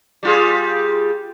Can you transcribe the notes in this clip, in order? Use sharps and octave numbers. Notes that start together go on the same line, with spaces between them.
G3 F4 G#4